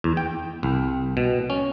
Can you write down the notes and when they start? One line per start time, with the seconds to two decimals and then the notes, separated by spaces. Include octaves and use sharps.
0.04 E2
0.17 G5
0.63 C2
1.17 B2
1.50 C#4